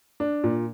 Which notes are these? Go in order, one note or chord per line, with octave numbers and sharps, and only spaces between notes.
D4
A#2